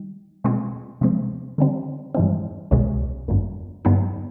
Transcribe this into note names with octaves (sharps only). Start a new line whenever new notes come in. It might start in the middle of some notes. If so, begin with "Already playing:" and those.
Already playing: D#3 G3
B2 G#3 C4 F4 G#4
C3 F3 G#3 C4
D3 G3 C4
G2 E3 G#3 C4
C2 B2 G#3 C#4
G#1 F#2 D3
G2 D3 F#3 B3 D#4